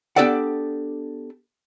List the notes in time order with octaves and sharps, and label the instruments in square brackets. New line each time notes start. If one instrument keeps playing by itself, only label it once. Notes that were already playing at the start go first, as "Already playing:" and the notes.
[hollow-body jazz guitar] B3 D4 G4 A4 D5 F#5